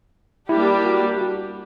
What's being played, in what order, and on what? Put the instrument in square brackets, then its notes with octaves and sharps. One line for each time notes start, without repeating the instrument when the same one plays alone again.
[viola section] G3 A#3 D4 G4 [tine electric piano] E4
[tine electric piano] F#4
F#4